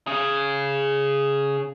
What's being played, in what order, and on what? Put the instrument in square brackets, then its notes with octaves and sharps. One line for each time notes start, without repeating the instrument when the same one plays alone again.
[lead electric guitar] C#3 G#4